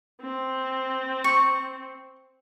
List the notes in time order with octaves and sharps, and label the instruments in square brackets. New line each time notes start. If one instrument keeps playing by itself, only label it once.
[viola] C4
[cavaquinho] C#6